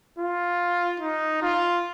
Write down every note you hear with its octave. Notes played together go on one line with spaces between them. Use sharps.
F4
D#4
F4